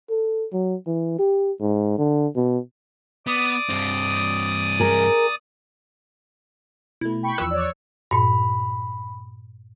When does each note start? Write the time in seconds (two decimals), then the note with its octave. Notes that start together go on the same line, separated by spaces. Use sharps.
0.10 A4
0.53 F#3
0.87 E3
1.19 G4
1.61 G#2
1.99 D3
2.36 B2
3.27 B3 D5 D#6
3.69 G2 C4
4.80 G#4 A#4
7.01 B2 A3 E4
7.23 G5 B5 C#6
7.38 E2 F3 E6 F#6
7.51 C#5 D5
8.11 G2 A#2 B5